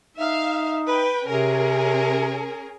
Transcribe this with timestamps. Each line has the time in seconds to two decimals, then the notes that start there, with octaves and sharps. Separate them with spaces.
0.17 D#4 E5 F5
0.88 B4 G5
1.28 C3 C#4 G#4 A#4